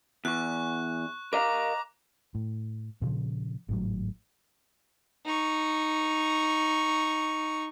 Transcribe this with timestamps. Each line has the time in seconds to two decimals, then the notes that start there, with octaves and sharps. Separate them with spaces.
0.25 E2 C#6 F#6
1.33 A#4 D#5 F5 A#5 D6
2.35 A2
3.02 A#2 C#3 E3 F3
3.69 G#1 A2 F#3
5.25 D#4 C#6